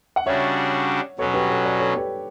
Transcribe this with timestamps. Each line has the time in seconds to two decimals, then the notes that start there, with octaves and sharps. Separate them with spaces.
0.16 F#5
0.26 C#3 G3 D4 F#4 C#5 E5
1.18 B2 F#3 C#4 A4 C#5
1.34 G4 B4
1.49 A4 C#5
1.65 B4 D5
1.80 A4 C#5
1.96 G4 B4